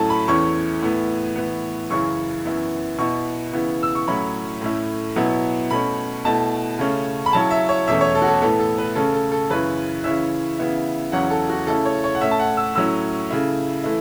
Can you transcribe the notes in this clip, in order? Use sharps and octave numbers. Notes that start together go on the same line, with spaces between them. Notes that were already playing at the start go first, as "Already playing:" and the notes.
Already playing: A2 F#3 A3 C#4 E4 A5
B5
E2 E3 A3 C#4 E4 C#6
A2 E3 B3
A2 E3 B3
F#2 C#3 E3 C#4 E4 C#6
F#2 E3 B3 E4
B2 B3 E4 C#6
C#3 E3 B3 E4
E6
C#6
A2 F#3 C#4 E4 B5
A2 A3 C#4 E4
B2 F#3 B3 E4
B2 A3 C#4 B5
B2 A3 E4 A5
C#3 A3 C#4
B5
C#3 F#3 C#4 E4 A5
E5
C#5
E2 B2 A3 C#4 E5
C#5
A4
F#4
A4
A2 E3 B3 A4
A4
B4
C#3 A3 C#4 A4
A4
A4
F#2 C#3 E3 C#4 E4 B4
C#3 E3 C#4 E4 E5
C#3 E3 B3 E4
E2 C#3 F#3 C#4 E4 F#5
A4
F#4
C#3 A3 C#4 E4 A4
C#5
C#5
F#5
A2 A3 C#4 E5
A5
F#5
E6
A2 F#3 C#4 E4 E6
C#3 A3 E4
E3 A3 E4